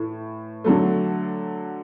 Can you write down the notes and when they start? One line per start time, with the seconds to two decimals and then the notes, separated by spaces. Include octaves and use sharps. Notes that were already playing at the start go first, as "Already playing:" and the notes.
Already playing: A2 E3
0.64 D3 F#3 A3